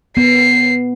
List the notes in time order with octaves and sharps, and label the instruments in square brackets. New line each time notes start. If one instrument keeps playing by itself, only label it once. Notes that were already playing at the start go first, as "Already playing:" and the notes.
[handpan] B3 [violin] C7